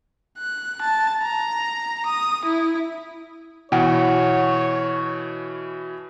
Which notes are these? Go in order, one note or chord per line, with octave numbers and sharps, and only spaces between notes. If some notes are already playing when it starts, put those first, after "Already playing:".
F#6
A5
A#5
D#6
E4
B2 E3 C#5 F#5